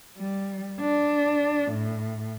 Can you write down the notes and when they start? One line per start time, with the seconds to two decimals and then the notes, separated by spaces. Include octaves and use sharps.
0.18 G3
0.81 D4
1.71 A2